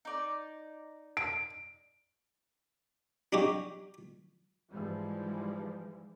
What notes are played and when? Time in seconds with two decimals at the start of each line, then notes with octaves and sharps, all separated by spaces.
0.05 D#4 D5
1.17 D7
3.33 D4 D#4 F#4 G4
4.71 G#2 E3 F3 G3 G#3